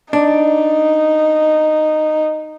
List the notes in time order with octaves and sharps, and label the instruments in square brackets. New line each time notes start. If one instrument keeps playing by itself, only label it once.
[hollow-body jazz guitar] D4 [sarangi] D#4